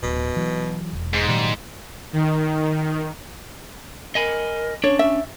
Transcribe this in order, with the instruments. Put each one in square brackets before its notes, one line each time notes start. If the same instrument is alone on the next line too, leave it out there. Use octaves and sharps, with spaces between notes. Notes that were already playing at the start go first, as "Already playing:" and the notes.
[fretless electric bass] D1 [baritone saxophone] B2
[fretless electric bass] E3 F#3
E1
[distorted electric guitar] G#2 [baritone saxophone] G#3
[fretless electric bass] A#2 D#3 F#3 [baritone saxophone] G3
[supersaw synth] D#3
[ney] A#4 [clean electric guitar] D#5 G#5 B5
[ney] C#4 [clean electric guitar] D4 [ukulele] C#5
[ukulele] E5